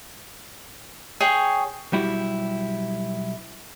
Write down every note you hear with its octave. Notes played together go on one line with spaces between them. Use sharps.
G#4 C#5 G5 G#5
B1 G3 E4 F#4 G4